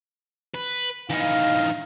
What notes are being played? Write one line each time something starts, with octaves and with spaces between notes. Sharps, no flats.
B4
E3 D#4 F5